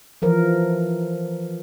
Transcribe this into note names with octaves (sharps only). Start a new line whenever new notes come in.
E3 F3 A#4